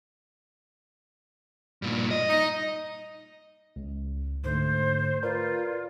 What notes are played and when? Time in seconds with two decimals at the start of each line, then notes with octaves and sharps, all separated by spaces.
1.82 G2 A#2
2.11 D#5
2.29 D#4
3.76 C#2
4.44 G#2 D3 A3 C5
5.23 F4 A#4 B4 D5